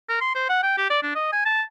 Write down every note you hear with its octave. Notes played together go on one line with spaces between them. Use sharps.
A#4
C6
C5
F#5
G5
G4
D5
D4
D#5
G#5
A5